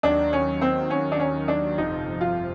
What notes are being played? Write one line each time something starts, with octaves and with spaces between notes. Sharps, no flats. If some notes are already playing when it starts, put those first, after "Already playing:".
D#2 D#3 F#3 D4
C#4
C4
C#4
D4
C#4
D4
G1 F2 C3 F3 D#4
F4